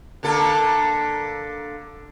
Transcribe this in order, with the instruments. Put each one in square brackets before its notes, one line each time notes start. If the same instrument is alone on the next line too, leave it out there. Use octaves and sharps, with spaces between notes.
[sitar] D3 A#3 A4